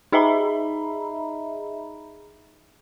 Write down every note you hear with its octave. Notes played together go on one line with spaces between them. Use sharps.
D#4 G#4 D#5 E5 A#5 B5